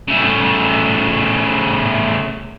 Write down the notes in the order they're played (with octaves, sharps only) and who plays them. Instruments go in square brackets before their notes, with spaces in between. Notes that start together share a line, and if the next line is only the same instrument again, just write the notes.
[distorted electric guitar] C#3 A3